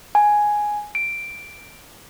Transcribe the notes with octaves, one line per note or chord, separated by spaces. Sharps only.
G#5
D7